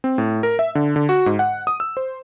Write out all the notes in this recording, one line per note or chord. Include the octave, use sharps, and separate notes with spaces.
C4
A2
A#4
E5
D3
D3
F#4
G#2
F#5
D#6
E6
C5